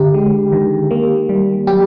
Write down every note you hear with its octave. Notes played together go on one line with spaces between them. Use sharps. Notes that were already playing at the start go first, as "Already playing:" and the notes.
Already playing: D3 G4
G#3
D#3
A#3
G3
F#3 G4